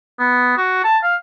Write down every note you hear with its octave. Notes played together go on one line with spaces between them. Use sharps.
B3
F#4
A5
F5